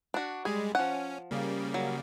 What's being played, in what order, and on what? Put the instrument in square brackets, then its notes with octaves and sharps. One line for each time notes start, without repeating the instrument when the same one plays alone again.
[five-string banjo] D4 F#4
[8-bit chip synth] G3 G#3 [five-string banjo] G#4
[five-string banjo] F3 F#5 [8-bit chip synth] C#4
[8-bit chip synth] C#3 G3 A#3
[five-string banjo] F#3